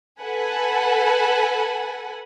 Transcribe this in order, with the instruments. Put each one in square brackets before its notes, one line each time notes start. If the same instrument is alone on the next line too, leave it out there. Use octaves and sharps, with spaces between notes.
[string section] A4 B4 F#5 G#5